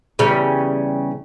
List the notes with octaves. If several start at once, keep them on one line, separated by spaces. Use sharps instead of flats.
E2 C#3 G3